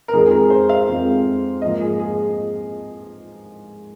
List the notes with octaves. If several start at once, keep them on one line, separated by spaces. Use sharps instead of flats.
A#4
F2 D#3 G#3 C4 G#4
G#4
A#4
C5
F5
F2 D#3 G#3 C4
G#2 F3 A#3 D#5
G#4
G#4